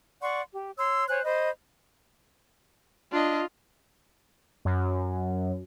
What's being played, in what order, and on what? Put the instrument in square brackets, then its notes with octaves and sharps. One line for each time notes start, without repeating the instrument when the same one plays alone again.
[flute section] D5 F#5 C6 C#6
G4
C#5 C6 E6
C5 C#5 G#5 F#6
C5 D#5 B5
[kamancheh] D4 D#5 [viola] F4
[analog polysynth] F#2